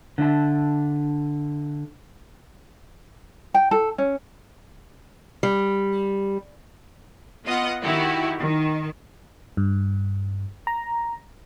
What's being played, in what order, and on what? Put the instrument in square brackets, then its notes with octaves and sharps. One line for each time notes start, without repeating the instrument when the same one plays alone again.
[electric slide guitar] D3 D4 E5 A5
[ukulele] G5
A4
C#4
[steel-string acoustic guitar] G3
[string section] B3 F4 D#5 F#5
D#3 E4 F#4 G4
D#3
[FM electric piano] G2
A#5